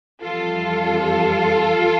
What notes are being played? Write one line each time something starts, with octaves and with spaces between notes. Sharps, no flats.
F2 E3 G3 F4 A4